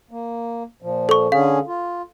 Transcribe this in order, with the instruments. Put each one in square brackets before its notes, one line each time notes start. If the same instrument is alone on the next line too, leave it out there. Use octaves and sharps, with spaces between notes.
[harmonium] A#3
A#2 F3
[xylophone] A4 C#6
[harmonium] D3 C#4 G#4 [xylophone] F5
[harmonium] F4